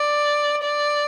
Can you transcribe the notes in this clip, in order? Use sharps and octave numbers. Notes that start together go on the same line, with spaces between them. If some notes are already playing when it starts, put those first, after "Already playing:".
Already playing: D5
D5